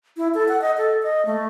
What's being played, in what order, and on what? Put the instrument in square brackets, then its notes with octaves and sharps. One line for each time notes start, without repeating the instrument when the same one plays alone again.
[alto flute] E4
A4
F#5
D#5
A4
D#5
A3